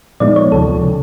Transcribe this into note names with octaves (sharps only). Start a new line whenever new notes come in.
A#2 F3 G#3 B3 D#4 D5
C#5
D2 C3 F3 A4
C#3